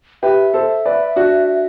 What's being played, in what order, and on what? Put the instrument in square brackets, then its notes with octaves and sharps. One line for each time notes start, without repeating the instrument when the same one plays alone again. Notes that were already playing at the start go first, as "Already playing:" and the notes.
[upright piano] G4 B4 [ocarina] E5
[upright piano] A4 C5
B4 D5
D4 F#4